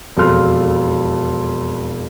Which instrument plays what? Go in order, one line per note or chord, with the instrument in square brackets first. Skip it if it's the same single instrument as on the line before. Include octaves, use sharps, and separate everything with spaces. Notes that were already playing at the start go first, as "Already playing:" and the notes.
[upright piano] E1 F2 F4 A4 C6 F6